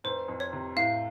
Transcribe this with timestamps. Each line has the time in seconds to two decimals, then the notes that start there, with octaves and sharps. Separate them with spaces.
0.04 F1 C5
0.28 F2
0.40 C#5
0.53 C3
0.76 A2 F5